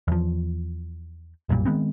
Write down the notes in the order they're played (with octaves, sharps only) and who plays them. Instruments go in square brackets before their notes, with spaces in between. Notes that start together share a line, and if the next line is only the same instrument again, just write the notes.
[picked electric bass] E2 F3
B1 F#2 A#2 G3
D#3 G#3 B3 C4